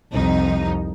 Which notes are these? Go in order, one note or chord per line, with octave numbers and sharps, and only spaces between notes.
C2 F2 D#4